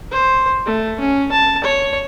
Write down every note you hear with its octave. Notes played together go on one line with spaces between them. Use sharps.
C5
A3
C#4
A5
C#5